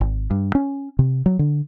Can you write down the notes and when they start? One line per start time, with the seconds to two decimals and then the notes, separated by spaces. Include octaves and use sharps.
0.01 G#1
0.31 G2
0.55 C#4
0.99 C3
1.26 F#3
1.39 D3